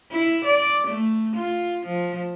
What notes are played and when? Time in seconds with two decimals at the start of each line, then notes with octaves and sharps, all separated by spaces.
0.12 E4
0.45 D5
0.87 A3
1.36 F4
1.86 F3